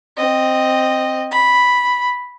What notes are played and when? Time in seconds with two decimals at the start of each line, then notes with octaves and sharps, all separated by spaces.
0.17 C4 D#5
1.31 B5